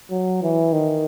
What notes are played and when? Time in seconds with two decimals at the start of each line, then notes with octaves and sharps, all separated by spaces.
0.11 F#3
0.43 E3
0.73 D#3